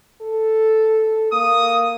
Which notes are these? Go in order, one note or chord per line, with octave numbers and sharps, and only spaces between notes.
A4
A#3 D#6